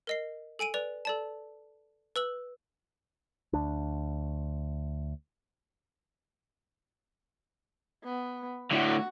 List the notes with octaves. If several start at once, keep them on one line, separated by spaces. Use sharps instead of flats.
A#4 D#5 C7
A4 G#5 D7 D#7
B4 D5 F7
A4 D5 A5
B4 E6 F#7
D2 D4
B3
A2 D3 F#4